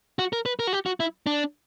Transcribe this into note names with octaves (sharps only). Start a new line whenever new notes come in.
F#4
A#4
B4
A#4
F#4
G4
F#4
E4
D4